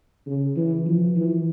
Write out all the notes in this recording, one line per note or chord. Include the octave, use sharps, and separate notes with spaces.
C#3
E3
F3
E3